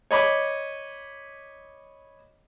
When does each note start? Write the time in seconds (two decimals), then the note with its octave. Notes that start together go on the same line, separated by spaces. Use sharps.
0.11 C#5 D#5 B5 D6